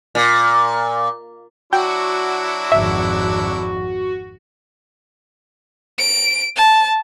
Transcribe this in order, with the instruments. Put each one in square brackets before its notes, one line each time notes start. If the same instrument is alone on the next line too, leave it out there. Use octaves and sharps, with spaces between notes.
[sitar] A#2
[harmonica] F#3 D4 E4 [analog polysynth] F#4 [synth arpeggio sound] G5
[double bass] G#1 F2 [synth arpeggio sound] E5
[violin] D7
A5